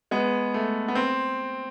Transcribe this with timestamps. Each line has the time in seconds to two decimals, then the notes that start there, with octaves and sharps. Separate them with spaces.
0.11 G#3 B3
0.54 A3
0.88 B3
0.95 C4